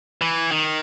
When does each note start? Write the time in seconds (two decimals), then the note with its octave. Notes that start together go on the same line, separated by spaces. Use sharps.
0.21 E3
0.52 D#3